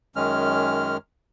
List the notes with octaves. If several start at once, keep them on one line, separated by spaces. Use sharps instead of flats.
F#2 D#3 G#3 C#4 F6